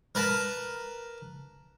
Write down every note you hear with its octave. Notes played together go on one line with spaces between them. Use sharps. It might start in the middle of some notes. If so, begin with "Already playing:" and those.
A#4 B4 A5